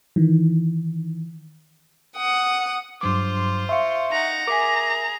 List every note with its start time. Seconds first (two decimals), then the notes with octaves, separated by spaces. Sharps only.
0.16 D#3 E3
2.17 F#5 D#6
3.01 G2 F#3 F4 C5 D6
3.69 E5 F5 C6 C#6 C#7
4.12 D#4 F#5 A#5
4.48 G#4 A#4 E5 G#5 D6 B6